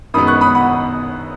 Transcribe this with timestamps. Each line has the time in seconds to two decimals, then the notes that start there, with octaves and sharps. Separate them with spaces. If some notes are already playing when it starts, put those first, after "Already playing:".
0.14 F#2 D#3 G#3 B3 B5 D#6
0.27 C#6 F#6
0.41 B5 D#6
0.55 F#5 B5